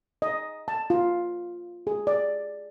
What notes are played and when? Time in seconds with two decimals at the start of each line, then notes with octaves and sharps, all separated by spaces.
0.22 D#5
0.68 A5
0.90 F4
1.87 G#4
2.07 D5